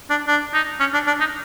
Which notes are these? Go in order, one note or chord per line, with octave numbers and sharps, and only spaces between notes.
D4
D4
D#4
C#4
D4
D4
D#4